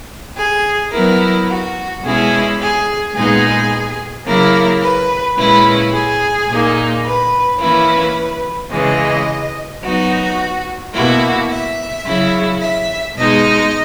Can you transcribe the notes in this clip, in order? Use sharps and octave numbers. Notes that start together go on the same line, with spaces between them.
G#4
F#3 B3 E4 A#4
F#4
B2 G#3 C#4 E4 G#4
G#4
A#2 G#3 B3 D#4 G#4
C#3 F#3 A#3 E4 A#4
B4
A#2 G#3 C#4 E4 B4
G#4
A#2 A#3 D#4
B4
E3 A#3 C#4 E4 B4
C#3 E3 G#3 D#5
F#3 B3 D#4 F#4
B2 A#3 E4 F#4
E5
C#3 F#3 C#4 E4
E5
B2 G#3 D#4 D#5